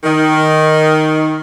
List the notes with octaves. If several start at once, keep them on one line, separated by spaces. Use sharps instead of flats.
D#3